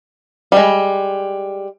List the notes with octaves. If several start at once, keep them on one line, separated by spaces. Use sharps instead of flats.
G3 G#3